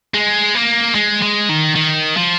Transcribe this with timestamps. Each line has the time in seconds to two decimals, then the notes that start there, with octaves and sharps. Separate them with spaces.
0.14 G#3
0.55 A#3
0.95 G#3
1.22 G#3
1.49 D#3
1.76 D#3
2.17 F3